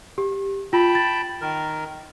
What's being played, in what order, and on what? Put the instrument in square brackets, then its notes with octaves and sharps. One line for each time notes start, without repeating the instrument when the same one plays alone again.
[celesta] G4
[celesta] F4 [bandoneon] G5 A5 B5
[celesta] A6
[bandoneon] D#3 A#4